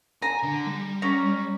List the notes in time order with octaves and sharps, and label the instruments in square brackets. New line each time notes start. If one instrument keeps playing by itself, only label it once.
[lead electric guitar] G#5 [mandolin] A#5
[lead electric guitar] D3
G3
[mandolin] C#4 A#5